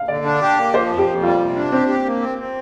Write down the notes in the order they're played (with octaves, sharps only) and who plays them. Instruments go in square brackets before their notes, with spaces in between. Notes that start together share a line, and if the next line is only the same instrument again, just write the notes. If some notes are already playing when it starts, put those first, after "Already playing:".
Already playing: [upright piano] F5
[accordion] D3 [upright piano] D5
[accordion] D4
G4
A#3
[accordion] F3 [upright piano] C5
[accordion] F2
[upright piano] G4
[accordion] F2
[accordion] G3 [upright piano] F4
[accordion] C3
D4
[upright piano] C4 [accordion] G4
[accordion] G4
A#3
C4
C4